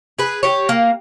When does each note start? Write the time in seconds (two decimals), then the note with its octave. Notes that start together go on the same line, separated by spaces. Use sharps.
0.19 G#4 B4
0.43 G4 C#5
0.69 A#3